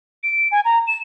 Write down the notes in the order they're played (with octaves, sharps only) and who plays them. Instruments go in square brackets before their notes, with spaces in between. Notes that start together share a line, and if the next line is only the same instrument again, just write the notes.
[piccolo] D7
G#5
A#5
E7